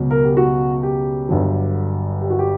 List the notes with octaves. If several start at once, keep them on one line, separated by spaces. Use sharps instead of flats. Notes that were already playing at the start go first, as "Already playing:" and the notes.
Already playing: C#2 B2 F#3
A#4
G4
F#4
G4
G1 G2 D3 F#3
G4
F#4
G4